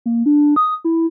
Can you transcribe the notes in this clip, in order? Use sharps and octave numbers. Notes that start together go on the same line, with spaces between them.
A#3
D4
D#6
E4